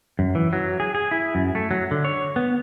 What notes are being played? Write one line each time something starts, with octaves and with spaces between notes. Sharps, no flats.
F#2
E3
F#3
G#4
G#4
E4
F#2
A3
F#3
D3
C#5
B3